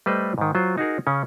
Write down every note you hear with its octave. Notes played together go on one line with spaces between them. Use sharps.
G3 A3 B4 C5 D#5
G#2 D#3
F#3 F4 C5
D#4 F#4 G#4 A#4
C#3 C#4